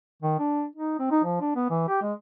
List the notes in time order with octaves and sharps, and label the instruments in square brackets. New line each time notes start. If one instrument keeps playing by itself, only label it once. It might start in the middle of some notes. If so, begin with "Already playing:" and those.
[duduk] D#3
D4
D#4
C4
D#4
F3
D4
B3
E3
G4
G#3